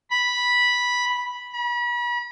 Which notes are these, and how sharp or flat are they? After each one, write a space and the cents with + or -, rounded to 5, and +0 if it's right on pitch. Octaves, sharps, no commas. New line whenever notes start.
B5 -10
B5 -40